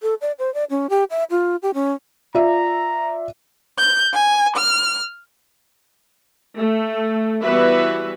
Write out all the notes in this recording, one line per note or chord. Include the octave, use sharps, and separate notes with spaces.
A4
D5
C5
D5
C#4
G4
E5
F4
G4
C#4
F4 D5 E5 A#5
G6
G#5
F6
A3
E3 G3 B3 F#4 B4 E5